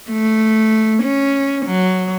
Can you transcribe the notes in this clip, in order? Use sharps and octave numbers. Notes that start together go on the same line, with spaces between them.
A3
C#4
F#3